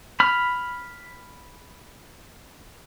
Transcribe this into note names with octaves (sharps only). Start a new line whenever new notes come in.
B5 F6